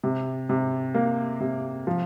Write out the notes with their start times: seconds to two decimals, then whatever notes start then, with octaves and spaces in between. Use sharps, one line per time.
0.04 C3
0.49 C3
0.95 A#3
1.40 C3
1.87 F3